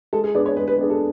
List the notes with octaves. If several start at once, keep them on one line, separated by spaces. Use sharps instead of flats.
G#3 A4
G#4
B3 D4 G#4 D5
C#5
G#3 B4
B4
B3 D4 G#4
A4